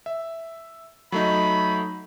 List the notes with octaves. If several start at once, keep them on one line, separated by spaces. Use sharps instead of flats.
E5
F#3 A3 D#4 B5